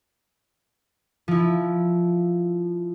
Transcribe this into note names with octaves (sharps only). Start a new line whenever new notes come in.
F3 E4